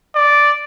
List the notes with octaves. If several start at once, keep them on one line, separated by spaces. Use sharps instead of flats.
D5